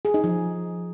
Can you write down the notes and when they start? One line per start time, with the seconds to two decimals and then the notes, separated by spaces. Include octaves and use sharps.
0.05 G#4
0.14 D#4
0.24 F3